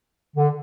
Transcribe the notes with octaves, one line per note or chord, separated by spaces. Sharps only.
D3